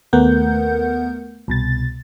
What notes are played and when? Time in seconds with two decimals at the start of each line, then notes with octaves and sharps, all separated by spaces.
0.13 D#2 A3 B3 A#4 F#5 G6
1.48 C2 B2 A6